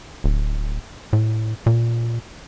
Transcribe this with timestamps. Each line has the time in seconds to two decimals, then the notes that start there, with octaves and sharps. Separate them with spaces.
0.24 D1
1.13 A2
1.66 A#2